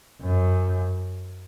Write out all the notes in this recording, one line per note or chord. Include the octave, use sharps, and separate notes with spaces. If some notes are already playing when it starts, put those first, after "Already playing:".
F#2